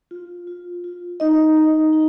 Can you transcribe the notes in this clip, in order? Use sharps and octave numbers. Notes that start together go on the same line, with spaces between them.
F4
F4
F4
D#4 D#5
D#4
D#4